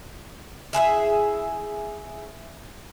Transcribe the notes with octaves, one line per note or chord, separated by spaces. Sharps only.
E4 G#4 B4 E5